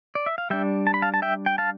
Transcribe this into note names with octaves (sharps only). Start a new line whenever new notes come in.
D5
E5
F5
G3 D4 E5 G5
A5
B5
F5 A5
A5
E5 G5
G5
F5 A5